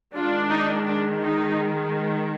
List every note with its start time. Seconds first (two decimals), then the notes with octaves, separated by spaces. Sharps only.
0.15 D#3 G#3 D4 F4
0.51 D#4
0.87 D4
1.22 D#4